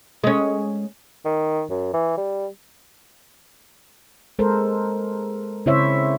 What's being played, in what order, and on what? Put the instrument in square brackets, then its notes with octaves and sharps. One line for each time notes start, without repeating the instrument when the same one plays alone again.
[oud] G#3 C#4
[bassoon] D#3
F#2
E3
G3
[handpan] G#3 A4 A#4 C5
C#3 C4 E4 C5 C#5 E5